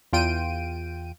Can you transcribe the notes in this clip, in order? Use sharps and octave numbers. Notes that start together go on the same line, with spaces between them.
E2 F4 G5 D7 D#7